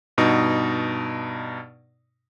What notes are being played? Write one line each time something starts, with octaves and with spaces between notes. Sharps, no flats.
G2 B2 D#4